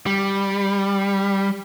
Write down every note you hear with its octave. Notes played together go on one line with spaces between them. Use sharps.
G3